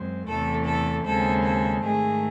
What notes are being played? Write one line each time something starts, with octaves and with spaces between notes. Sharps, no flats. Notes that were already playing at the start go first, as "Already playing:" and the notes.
Already playing: F#2 G#3 C4
E2 C3 E3 A3 A4
A4
D#2 C#3 G#3 C4 A4
A4
G#2 D#3 A3 G#4